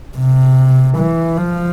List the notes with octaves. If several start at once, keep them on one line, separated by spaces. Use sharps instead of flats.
C3
E3
F3